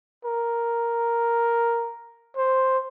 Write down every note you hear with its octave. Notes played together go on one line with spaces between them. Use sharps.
A#4
C5